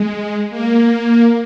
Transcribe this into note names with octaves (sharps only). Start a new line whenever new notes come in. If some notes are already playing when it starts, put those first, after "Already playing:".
Already playing: G#3
A#3